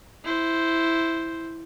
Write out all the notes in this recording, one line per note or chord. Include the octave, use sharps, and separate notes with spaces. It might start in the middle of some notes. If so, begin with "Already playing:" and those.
E4 C5